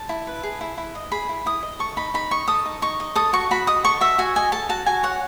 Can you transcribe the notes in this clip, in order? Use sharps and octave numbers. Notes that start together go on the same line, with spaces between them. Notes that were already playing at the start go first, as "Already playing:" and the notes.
Already playing: A5
E4
B4
G#4
E4
E4
D#5
G#4 B5
E4
E4 D#6
D#5
A4 C#6
D#4 B5
D#4 B5
D#5 C#6
A4 D#6
D#4
D#4 C#6
D#5
A4 D#6
F#4 C#6
F#4 B5
D#5 D#6
A4 C#6
F#4 E5
F#4 G#5
D#5 G#5
A4 A5
F#4 A5
F#4 G#5
C#5 F#5